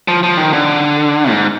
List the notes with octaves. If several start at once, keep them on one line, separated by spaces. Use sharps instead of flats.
F3
F3
D#3
D3
G#2